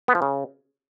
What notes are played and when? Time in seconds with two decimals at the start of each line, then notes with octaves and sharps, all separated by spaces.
0.08 B3
0.15 F3
0.22 C#3